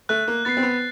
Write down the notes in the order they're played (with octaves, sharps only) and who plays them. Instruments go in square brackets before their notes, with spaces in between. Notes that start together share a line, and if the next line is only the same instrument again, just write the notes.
[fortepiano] A3 [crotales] F#6
[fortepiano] A#3
[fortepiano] B3 [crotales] A6 C7
[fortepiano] C4
B3